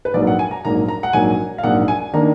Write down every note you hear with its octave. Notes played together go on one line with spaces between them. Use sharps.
B4
A#1 G#2 F#3 A#3 D5
F#5
G#5
A#5
A#1 G#2 F#3 A#3 A#5
A#5
F#5
A#1 G#2 F#3 A#3 G#5
F5
A#1 G#2 F#3 A#3 F#5
G#5
D#3 A#3 D4 A#5